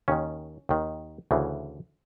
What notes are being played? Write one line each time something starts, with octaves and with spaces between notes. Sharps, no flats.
D#2 D#3 C#4
D#2 D#3
D2 C#3 E3